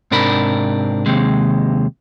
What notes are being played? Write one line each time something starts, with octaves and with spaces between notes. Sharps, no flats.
G#2 C3 D4 A#4 B5
D#2 C3 G#3